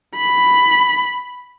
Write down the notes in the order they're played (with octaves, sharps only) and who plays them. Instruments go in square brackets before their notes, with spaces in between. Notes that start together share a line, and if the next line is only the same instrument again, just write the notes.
[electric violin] B5